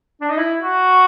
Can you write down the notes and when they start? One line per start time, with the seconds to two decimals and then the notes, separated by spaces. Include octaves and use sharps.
0.21 D4
0.30 D#4
0.38 E4
0.62 F#4